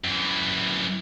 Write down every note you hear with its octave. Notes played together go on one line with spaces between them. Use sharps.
F#2 E3